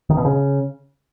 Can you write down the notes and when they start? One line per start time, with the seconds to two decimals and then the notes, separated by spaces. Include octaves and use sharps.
0.10 D#3
0.17 B2
0.25 C#3